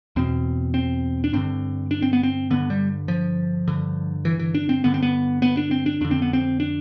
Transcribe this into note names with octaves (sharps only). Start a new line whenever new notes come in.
E2 B2 C4
C4
D4
G2 D3 C4
D4
C4
B3
C4
G2 D3 B3
G3
F3
G2 D3
E3
E3
D4
C4
G2 D3 B3
C4
B3
B3
D4
C4
D4
F2 D3 D4
C4
B3
C4
D4